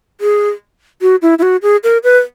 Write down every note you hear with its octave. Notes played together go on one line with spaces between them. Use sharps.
G#4
F#4
E4
E4
F#4
G#4
A#4
B4